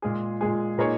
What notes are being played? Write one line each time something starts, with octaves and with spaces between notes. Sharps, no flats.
A#2 G#3 F4 G#4
A#2 G#3 F4 G#4
A#2 A#3 D#4 G#4 C#5